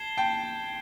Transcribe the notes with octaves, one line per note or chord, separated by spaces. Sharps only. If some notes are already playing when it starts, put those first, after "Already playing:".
Already playing: A5 G#6 C7 E7 G7
G5 A5